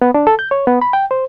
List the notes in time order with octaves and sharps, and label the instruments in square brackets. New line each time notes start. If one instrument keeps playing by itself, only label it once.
[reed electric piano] B3
D4
A4
G6
C#5
B3
B5
G5
C5